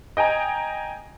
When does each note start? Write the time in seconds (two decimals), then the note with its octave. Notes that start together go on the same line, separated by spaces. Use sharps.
0.17 D#5 G5 G#5 A#5